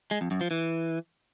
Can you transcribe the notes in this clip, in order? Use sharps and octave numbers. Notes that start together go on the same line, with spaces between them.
G#3
F2
F#2
F3
E3